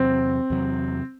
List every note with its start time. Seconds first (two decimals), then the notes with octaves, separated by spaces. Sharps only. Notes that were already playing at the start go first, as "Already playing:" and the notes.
Already playing: E2 C3 F#3 C4
0.50 E2 C3 F#3